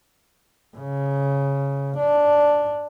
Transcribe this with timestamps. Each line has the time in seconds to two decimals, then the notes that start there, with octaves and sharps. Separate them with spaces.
0.77 C#3
1.97 D4